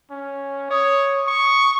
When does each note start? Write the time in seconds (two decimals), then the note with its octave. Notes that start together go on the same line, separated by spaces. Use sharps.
0.10 C#4
0.71 C#5 D#6
1.27 C#6